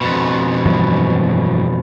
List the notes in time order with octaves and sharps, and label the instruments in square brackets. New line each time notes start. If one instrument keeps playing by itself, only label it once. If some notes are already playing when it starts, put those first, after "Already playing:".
[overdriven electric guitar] F2 B2
[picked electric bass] G2 E3 F#3